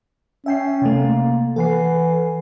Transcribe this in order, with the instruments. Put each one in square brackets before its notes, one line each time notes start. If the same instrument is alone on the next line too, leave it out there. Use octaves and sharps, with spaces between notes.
[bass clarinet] C#4 [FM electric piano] E5 G5 C7
[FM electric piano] C3 A3 [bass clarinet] A#3
[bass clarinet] E3 [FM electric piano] A4 F#5 C7